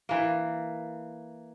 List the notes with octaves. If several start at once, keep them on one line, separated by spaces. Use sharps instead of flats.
E3 A#3